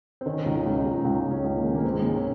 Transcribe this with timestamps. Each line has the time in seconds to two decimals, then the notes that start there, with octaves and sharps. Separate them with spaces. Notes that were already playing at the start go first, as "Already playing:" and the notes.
0.21 C4
0.26 D#3 C#4
0.46 C#2 D#4
0.53 C#4
0.66 C#2
0.79 D#4
0.86 C#2
1.05 C#2 C#4
1.26 C#2
1.31 C#4
1.44 C#2
1.58 A#3
1.64 D#3 G#3
1.75 A#3
1.84 D#3 C4
1.94 G#3
2.02 C3 A#3
2.09 C4
2.16 C#4